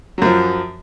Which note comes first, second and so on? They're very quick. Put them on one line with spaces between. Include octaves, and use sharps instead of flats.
F#3 F#2 F3